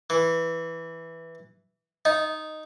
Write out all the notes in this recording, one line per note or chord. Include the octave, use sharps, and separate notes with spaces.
E3
D#4 D#5